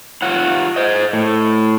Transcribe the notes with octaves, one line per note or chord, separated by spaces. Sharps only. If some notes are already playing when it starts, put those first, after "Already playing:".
F4 C#5 F#5
C5 D#5
A2